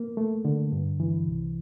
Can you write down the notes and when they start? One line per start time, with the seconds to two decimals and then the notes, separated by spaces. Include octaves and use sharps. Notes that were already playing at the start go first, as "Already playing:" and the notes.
Already playing: A#3
0.17 A3
0.45 D3
0.72 G2
1.00 E3
1.27 C2